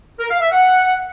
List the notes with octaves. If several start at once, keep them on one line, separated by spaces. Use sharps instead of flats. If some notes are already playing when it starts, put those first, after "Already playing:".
A#4
F5
E5
F#5